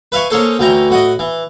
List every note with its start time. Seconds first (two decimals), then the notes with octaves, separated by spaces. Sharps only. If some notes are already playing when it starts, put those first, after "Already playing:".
0.12 B4 E5 F5 G#5 C#6
0.30 A#3 C#4 G#4 A4 C5
0.59 D2 E3 C#4 G5 A#5
0.90 A2 F#4 D#5
1.19 E3